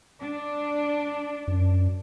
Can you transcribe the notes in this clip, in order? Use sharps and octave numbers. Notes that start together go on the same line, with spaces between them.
D4
F#2